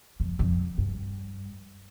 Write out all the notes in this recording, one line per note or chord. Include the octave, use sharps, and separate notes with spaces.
F2
F2
G2